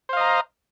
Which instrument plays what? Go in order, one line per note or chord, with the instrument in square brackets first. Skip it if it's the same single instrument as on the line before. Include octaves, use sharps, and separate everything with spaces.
[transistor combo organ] C5
F5
D#5
A#5